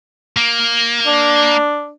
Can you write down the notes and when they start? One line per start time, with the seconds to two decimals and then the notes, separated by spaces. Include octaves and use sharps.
0.37 A#3
1.07 D4